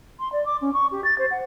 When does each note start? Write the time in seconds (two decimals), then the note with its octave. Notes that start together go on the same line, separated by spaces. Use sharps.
0.20 C6
0.32 D5
0.46 D6
0.61 C#4
0.74 C#6
0.92 G4
1.04 A6
1.18 C5
1.31 F#5